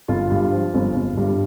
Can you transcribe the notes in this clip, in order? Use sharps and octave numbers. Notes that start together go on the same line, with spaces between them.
G1 F4
G2
F3
G1
G1
G2